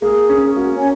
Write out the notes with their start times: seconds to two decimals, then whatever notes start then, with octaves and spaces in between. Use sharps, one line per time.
0.02 A#3 G#4
0.29 C#4
0.56 A#3 F#4
0.74 C#4